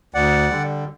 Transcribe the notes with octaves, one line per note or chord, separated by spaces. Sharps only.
D2 D5 F#5
D3 G3